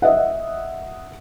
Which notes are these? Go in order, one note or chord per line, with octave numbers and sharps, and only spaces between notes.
D#5 E5 F#5